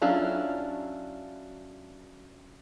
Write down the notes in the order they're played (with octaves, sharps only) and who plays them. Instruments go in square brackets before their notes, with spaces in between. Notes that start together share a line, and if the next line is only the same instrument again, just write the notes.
[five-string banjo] F#3 C#4 D4 E4 F4